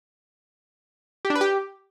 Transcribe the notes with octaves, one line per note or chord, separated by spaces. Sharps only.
G4
D4
B4
G4